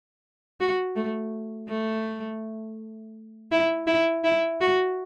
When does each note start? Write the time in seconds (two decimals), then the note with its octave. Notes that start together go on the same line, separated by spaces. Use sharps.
0.60 F#4
0.96 A3
1.68 A3
3.52 E4
3.87 E4
4.24 E4
4.61 F#4